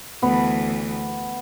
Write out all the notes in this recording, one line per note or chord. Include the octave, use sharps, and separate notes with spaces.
D2 E3 B3